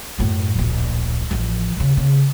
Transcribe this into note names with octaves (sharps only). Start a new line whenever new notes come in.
F#2 A2
D1 A#1
A1 F3
D#2 C#3
C#3